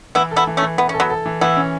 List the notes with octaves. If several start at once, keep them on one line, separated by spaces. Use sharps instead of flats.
E3 B3 E4
A4
B3 E4
E3
A3 C#4
E3
E3 B3
C#4 A4
F#3 B3
A4
E3
E3 B3 E4
C#4